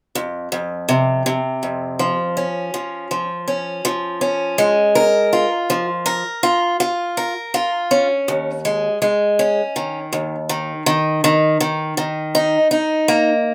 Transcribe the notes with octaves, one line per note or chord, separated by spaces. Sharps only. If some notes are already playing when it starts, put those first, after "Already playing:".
F2
F2
C3
C3
F2
F3
C#4
F3
F3
C#4
F3
C#4
G#3
A#4
F4
F3
A#4
F4
F4
A#4
F4
C#4
D#2
G#3
G#3
C#4
D#3
D#2
D#3
D#3
D#3
D#3
D#3
D#4
D#4
A#3